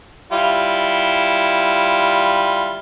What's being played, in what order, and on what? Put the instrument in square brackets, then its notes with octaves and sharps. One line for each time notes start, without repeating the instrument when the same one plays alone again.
[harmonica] G3 E4 F4